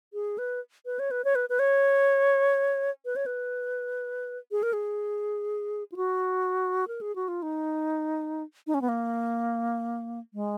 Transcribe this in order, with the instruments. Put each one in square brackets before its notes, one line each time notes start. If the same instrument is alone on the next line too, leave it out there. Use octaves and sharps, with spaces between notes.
[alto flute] G#4
B4
B4
C#5
B4
C#5
B4
B4
C#5
B4
C#5
B4
G#4
A#4
G#4
F4
F#4
A#4
G#4
F#4
F4
D#4
D#4
C#4
B3
A#3
G#3